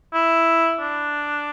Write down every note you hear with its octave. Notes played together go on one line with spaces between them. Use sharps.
E4
D4